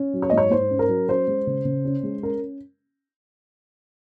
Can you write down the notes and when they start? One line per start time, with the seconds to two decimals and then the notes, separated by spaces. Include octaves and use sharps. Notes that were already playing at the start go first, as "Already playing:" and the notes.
Already playing: C#4
0.14 F#3
0.22 C#5
0.30 D#5
0.32 G#2
0.38 C#5
0.51 G#2 C5
0.71 C#4
0.79 A#4
0.89 F#3
1.09 C#4 C5
1.27 G#3
1.47 C#3
1.65 C#3
1.85 C#4
2.03 G#3
2.23 C#4 A#4